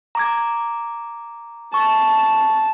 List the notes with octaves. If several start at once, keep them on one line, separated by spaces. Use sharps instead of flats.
A#5 D6 G#6
A5 C#6